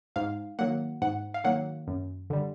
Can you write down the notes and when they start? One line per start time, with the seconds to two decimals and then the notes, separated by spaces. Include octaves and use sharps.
0.16 G#2 F5
0.59 D#3 F#3 A#3 F#5
1.02 G#2 F#5
1.34 F5
1.44 D#3 F#3 A#3 F#5
1.88 F#2
2.30 D3 G3